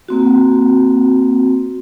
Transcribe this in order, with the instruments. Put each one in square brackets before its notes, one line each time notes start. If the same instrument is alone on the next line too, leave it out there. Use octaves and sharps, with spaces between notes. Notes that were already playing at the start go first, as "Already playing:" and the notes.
[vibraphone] A#3 C4 F#4